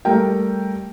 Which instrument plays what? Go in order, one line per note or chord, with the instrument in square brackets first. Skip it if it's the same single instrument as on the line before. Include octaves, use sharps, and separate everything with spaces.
[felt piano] G3 A3 A#4 G5